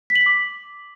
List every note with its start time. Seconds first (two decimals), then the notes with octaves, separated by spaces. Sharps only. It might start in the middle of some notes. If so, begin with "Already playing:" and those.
0.10 B6
0.15 F#7
0.21 B6
0.26 D6